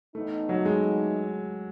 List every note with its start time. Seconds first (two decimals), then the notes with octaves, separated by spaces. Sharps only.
0.15 A2 E3 A3 B3 D#4
0.49 F#3
0.65 G#3